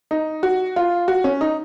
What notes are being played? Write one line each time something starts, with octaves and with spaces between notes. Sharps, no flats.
D#4
F#4
F4
F#4
C#4
D#4